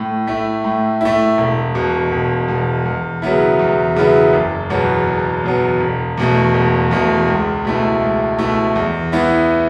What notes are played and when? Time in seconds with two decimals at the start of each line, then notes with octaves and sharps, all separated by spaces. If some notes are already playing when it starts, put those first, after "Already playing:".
Already playing: A2
0.27 A3 E4
0.64 A2
1.01 A3 E4
1.38 E1
1.75 E2 B2
2.12 E1
2.48 E2 B2
2.85 E2
3.22 C#3 F#3 B3 E4
3.59 E2
3.96 C#3 F#3 B3 E4
4.33 F#1
4.70 E2 B2 F#3 B3
5.07 F#1
5.44 E2 B2 F#3 B3
5.81 E1
6.17 E2 B2 A3
6.54 E1
6.91 E2 B2 A3
7.28 C#2
7.65 B2 A3 E4
8.01 C#2
8.38 B2 A3 E4
8.75 E2
9.12 E3 B3 E4